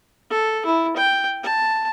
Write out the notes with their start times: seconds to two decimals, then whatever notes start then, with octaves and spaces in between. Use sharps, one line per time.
0.30 A4
0.66 E4
0.96 G5
1.43 A5